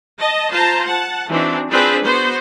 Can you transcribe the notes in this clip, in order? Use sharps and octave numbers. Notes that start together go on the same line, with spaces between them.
D#5 A5
F4 C5 A5 A#5
F#5 A5
E3 C4 D4 D#4 F#4
C4 D4 F4 G#4 B4 C5
B3 F#4 C5